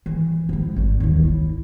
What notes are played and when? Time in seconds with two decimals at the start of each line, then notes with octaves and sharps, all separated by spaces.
0.06 E3
0.49 F3 G#3
0.76 G#1 G3
1.00 D#2 E3
1.23 E4